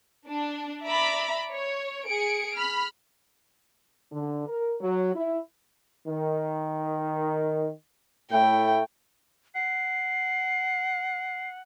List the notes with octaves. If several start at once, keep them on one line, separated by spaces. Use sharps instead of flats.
D4
D5 E5 A#5 B5 D6
C#5
G#4 C#7 D7
B5 F6
D3
A#4
F#3
E4
D#3
A2 A3 E4 G5
F#5 C7